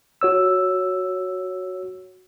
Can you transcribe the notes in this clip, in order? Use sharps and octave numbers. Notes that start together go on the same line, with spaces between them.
F#4 C#5 E6